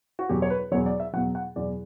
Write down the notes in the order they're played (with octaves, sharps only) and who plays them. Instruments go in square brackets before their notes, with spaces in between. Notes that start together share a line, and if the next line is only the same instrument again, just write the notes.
[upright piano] F#4
E2 B2 F#3 G4
C#5
B4
E2 B2 F#3 C#5
D5
E5
E2 B2 F#3 F#5
F#5
E2 B2 F#3 D5